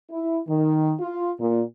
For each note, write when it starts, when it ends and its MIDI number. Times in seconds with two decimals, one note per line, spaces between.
0.10 0.40 64
0.48 0.93 51
1.00 1.31 65
1.40 1.62 46